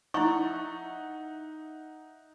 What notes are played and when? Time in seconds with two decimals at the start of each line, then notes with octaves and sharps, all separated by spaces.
0.14 D#4 E4 E5 F#5 C#6